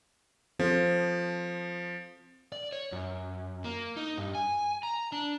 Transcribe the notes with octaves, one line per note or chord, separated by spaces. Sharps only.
F3 C4 F4 A4
D5
C#5
F#2
A#3
D#4
G2
G#5
A#5
D4